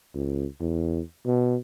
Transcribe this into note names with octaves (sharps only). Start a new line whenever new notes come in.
C#2
E2
B2